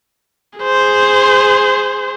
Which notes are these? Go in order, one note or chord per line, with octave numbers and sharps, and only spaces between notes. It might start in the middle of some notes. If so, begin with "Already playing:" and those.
G#4 C5